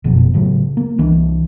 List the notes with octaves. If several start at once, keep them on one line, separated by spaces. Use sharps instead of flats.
F#1 F2 B2 F3
A2 C#3 F#3
A#3
C2 E3 D4